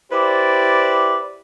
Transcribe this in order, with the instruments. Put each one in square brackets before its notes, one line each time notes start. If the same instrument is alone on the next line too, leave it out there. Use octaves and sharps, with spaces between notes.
[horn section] E4 G4 B4 C5 D5